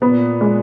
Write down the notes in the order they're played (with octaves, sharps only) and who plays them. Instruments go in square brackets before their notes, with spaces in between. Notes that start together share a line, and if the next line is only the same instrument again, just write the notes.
[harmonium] A#2 [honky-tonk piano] B3
[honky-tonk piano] G#3